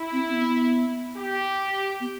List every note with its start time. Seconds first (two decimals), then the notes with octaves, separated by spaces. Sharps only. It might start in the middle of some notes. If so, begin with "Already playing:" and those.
Already playing: E4
0.12 C4
0.28 C4
0.33 B3
1.16 G4
2.00 B3